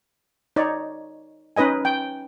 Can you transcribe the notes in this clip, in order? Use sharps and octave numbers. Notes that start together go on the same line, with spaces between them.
D#4 C#5 D5
C#4 D#4 B4 D#5 G#5
G5